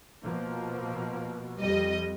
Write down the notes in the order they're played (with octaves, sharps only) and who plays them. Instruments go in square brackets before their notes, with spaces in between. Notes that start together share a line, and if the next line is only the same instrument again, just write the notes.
[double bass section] B2 F3 A#3
[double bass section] F2 [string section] G3 D#5